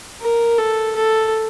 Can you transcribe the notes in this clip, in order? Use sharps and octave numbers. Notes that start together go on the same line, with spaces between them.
A#4
A4
A4